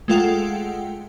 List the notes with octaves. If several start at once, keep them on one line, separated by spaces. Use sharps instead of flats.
G#3 A3 F4 A4 F#5 G5